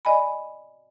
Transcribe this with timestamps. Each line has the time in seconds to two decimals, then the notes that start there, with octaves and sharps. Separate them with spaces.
0.05 D5 D#5 G#5 B5